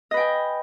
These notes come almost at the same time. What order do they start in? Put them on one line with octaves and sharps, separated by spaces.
D#5 B4 G5 G#5